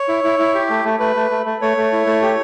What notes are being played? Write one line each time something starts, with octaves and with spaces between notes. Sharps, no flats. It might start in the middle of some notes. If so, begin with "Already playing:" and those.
Already playing: C#5
E4
E4
E4
G4
A3
A3
A3 B4
A3
A3
A3
A3 C#5
A3
E4
A3
G4